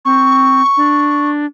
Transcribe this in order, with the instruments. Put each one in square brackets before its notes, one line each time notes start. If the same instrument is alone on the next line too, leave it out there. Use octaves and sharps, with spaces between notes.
[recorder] C4 [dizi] C#6
[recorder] D4